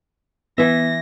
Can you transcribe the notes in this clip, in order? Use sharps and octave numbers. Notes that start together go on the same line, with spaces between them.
E3 B3 E5 A#6